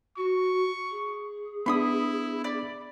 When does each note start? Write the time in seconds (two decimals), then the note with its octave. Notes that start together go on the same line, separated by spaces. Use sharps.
0.17 F#4 C#6
0.90 G#4
1.66 B3 D4 E4 B5 C6 D#6
2.44 D5 B5